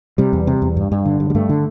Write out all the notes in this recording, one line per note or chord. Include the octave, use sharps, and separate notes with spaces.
C3 G3
E2
C3
E2
G2
G2
D3
G2
G3
G2 A3
D3